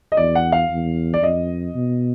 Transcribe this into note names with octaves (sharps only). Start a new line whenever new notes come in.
D#5
E2 D5
F#5
F5
E2
D5
F2 D#5
B2